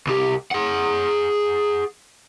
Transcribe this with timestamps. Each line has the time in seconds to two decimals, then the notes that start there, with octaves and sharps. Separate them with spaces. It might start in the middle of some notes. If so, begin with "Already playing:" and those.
0.07 C2 G4
0.51 G#4 F#5